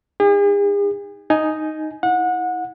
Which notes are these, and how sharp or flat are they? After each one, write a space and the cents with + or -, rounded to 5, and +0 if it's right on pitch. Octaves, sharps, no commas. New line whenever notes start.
D#4 +0 G#4 -45
D#4 +0 G#5 +15
E4 -20 F#5 -25